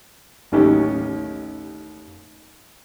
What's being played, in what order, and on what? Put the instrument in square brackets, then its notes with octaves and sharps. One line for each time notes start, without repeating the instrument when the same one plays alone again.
[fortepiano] A1 D#2 D#3 C#4 G4